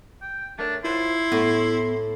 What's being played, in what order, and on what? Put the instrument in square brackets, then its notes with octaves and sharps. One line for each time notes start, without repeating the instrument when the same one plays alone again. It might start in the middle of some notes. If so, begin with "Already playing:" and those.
[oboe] G5
[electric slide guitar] A3 A#4 C#5 [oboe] D4
[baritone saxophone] E4 [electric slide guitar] F4 C5 C#5 [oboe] C6
[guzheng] A2 [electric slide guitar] B3